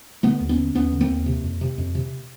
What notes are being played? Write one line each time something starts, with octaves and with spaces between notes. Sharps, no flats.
D3 A3 B3
D#2
B3 C#4
D3
D#2 B3 C#4
D3
A#3 C4
D#2
C3
F2
C3
F2
C3